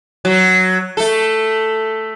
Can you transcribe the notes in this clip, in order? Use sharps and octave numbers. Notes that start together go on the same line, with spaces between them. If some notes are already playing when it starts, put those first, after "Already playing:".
F#3
A3 A4